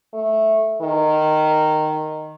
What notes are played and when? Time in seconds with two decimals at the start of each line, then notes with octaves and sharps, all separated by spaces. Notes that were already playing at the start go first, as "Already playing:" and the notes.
0.13 A3
0.81 D#3